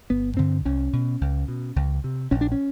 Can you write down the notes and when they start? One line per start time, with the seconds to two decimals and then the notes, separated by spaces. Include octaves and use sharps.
0.10 G1 B3
0.37 G2 D3 C4
0.65 C2 C#4
0.93 B2
1.21 C#2
1.48 B2
1.76 C#2
2.04 C3
2.31 A#1 C#4
2.41 D4
2.52 C#4